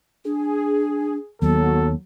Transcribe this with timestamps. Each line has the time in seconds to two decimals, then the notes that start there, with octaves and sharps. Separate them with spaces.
0.25 D4 G#4
1.42 D#2 F#3 B3 A4